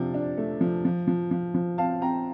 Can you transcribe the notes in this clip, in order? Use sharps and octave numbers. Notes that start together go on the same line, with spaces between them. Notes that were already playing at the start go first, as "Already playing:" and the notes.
Already playing: C3 F3 D4
D4
A3
F3
F3
F3
F3
F3
C4 F5 A5
C4 G5 A#5